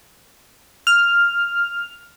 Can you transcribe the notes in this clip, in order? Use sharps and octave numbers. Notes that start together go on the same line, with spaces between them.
F6